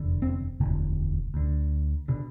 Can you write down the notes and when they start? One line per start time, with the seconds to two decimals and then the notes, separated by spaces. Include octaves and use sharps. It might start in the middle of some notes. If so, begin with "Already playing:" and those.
Already playing: F1 E2 D3
0.22 C4
0.59 E1 D2 D3
1.34 D2 D3
2.08 B2 D3